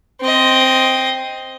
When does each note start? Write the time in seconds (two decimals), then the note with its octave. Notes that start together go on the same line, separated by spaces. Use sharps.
0.21 C4 D#5